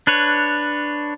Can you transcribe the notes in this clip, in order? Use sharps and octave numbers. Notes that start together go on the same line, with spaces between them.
D4 B4 C#5